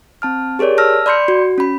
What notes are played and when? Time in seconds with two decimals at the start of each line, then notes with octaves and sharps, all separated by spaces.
0.22 C4 A5 F6
0.59 G4 G#4 A#4 C#5 D5
0.78 A5 E6 F6 A#6
1.06 D5 B5 C6 G6 C#7
1.28 F#4
1.58 C#4 B5